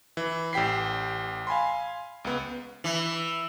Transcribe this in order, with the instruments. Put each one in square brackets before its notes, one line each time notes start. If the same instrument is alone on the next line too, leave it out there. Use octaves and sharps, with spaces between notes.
[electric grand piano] E3
A1 G4 G5 B6 C7
F5 G#5 B5 C6
C#2 B3
[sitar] E3